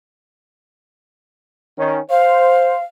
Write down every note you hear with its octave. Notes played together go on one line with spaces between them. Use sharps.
D#3 C#4
C5 F5